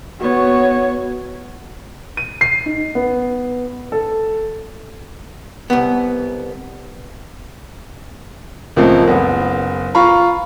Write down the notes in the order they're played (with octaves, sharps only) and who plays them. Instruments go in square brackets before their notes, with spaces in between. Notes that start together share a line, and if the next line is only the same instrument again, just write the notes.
[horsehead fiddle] B3 C#5 [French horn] F#4
[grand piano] D#7
C7
D#4
B3
A4
[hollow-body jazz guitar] C2 B3
[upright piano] C#2 A#2 F3 A3 A#3 C4
F#1 B3
F4 F5 A#5 B5 C#6